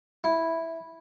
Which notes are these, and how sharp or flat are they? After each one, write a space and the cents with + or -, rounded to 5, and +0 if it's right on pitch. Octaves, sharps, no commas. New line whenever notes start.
E4 -5